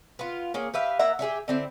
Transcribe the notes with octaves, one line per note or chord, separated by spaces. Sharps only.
B3 F4
A#3 C#4 G#4
G4 B4 E5 F5
A#3 E5 F#5 A#5
G4 G#4 C#5 E5
D3 C4 E4